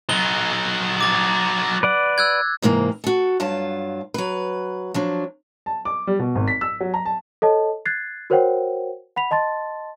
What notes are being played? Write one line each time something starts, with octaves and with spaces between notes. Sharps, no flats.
F#3 D#4 G7
D6 A6
B4 D5 F#5
E6 F#6 G#6
G#2 C3 E3 A#3
F#4 A4
G2 F#3 F4 A5
F#3 B4
F3 F#3 D4
A5
D6
G3
B2
G#1
B6
E6
F#3
A#5
A5
A4 C#5 D#5 A5
F#6 G#6 A6 C7
F#4 A#4 C5 C#5 F#5 G5
F#5 B5 B6 F7
D#5 A5 C6 A6